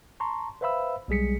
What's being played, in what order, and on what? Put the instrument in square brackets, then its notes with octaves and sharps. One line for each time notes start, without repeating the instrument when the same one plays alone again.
[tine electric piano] A5 A#5 C6 C#6
B4 C5 E5 F5 B5 E6
B1 G3 G#3 G#4 B6 C#7